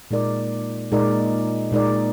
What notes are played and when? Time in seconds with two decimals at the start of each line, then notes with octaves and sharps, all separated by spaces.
0.11 A#2 G#3 D#4 A#4 D5
0.92 A#2 G#3 D#4 A#4 D5
1.72 A#2 G#3 D#4 A#4 D5